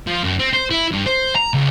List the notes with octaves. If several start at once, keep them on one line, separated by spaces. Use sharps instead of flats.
F3
F#2
C4
C5
E4
G2
C5
A#5
C#2